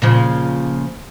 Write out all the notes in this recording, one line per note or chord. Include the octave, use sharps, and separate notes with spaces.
A#2 C#3 F3